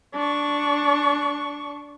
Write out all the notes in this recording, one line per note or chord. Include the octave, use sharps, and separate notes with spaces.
D4 C#6